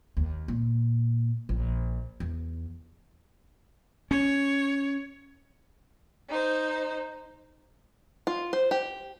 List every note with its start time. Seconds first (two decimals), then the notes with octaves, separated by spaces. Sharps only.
0.17 D#2
0.48 A#2
1.49 A#1
2.20 E2
4.11 C#4 C#5
6.28 D#4 C5
8.27 F4
8.53 C5
8.71 G4